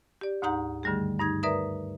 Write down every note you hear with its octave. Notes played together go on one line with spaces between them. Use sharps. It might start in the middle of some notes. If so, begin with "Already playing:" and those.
G4 D5
D2 G#2 D#4 F#5 A#5 G6
G2 D3 D#3 G3 A3 G#4
G2 D#4 G#6
A#4 B4 D5 E5 A#5 D#6